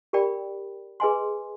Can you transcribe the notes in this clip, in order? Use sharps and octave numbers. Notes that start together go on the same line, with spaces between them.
G4 A#4 D5 G5 B5
G#4 B4 D#5 G#5 C6